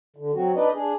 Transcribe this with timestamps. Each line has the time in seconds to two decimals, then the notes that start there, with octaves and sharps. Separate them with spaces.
0.16 D3
0.34 F#3 C4 F#4
0.55 D4 D#4 B4 D5 D#5
0.74 D4 G#4